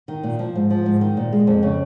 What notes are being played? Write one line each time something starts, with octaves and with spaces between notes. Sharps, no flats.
D#3
A#2
F3
G#2
F3
G#2
D#3
A#2
G#3
F2
C#3